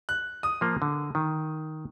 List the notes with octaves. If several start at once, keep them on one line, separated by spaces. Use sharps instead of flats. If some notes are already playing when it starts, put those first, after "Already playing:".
F#6
D#6
F3 A#3 F4
D3
D#3